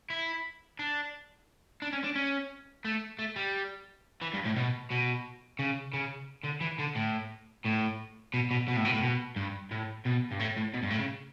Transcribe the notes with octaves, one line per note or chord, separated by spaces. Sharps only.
E4
D4
D4
C#4
D4
C#4
A3
A3
G3
E3
G2
A2
B2
B2
C#3
C#3
D3
E3
D3
A2
A2
B2
B2
B2
A2
B2
A2
B2
G2
A2
B2
G2
A2
A2
B2
G2
A2
C#3